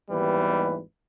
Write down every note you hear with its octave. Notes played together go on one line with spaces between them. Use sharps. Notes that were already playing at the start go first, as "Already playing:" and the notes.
G#1 D#2 E3 G3 B3 B4